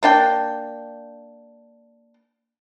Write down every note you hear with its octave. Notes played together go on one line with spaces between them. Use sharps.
A#3 D4 G5